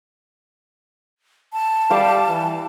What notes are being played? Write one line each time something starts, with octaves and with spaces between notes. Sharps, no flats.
A5
G3 F5 D6
E3